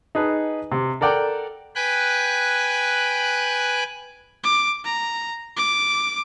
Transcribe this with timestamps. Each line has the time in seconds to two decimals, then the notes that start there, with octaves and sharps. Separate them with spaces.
0.15 D#4 G#4 B4 A5
0.72 C3
1.01 A4 A#4 D5 F#5 G5
1.75 B4 G5 G#5 B5 F#6
4.44 D6
4.84 A#5
5.57 D6